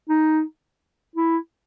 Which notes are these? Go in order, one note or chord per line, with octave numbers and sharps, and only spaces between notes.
D#4
E4